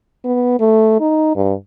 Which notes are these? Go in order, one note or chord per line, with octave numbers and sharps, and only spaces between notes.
B3
A3
D#4
G2